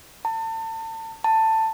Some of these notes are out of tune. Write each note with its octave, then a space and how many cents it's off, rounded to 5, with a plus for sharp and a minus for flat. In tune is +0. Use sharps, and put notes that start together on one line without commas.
A5 +35
A5 +15